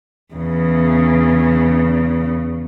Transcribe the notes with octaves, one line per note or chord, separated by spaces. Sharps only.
E2 C#3